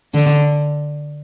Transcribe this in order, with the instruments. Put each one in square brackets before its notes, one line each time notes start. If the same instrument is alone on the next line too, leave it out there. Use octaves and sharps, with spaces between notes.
[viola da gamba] D3